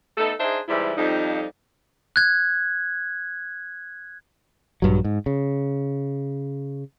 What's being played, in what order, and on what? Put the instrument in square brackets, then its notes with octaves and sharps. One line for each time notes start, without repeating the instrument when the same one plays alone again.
[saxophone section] A3 B3 D#4 A4
D4 D#4 G#4 C5 D#5 E5
G#2 C3 E3 G3 E4
F2 G3 D#4
[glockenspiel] F#6 G#6
[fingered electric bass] A#1 G2 F#3
G#2
C#3